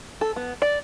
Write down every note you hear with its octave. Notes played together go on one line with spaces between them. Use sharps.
A4
B3
D5